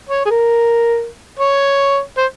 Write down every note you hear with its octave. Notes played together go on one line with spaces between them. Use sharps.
C#5
G#4
A#4
C#5
C5